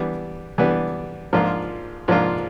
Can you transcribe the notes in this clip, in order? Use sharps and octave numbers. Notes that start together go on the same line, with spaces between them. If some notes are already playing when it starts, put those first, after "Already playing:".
Already playing: E3 G3 B3 D4
E3 G3 B3 D4
G#2 F3 A#3 D4 F4
G#2 F3 A#3 D4 F4